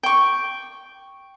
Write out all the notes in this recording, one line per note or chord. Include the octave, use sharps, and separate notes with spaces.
G5 C#6